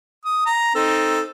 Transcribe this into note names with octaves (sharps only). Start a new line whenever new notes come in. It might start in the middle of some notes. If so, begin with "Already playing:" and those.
D#6
A#5
C4 D#4 A4